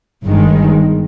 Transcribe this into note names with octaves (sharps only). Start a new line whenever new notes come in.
G1 G2 D#3 G#3